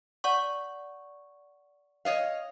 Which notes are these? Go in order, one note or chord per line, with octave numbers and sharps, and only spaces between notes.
D5 F#5 C#6
C#5 D#5 F5